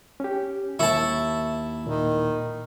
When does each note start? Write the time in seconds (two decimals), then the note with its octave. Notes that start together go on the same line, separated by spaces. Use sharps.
0.20 C#4 G4
0.79 D#2 E4 E5 A5 C#6
1.87 A#2 D#3